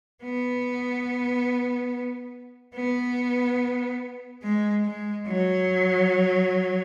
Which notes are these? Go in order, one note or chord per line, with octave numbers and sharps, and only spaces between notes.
B3
B3
G#3
G#3
F#3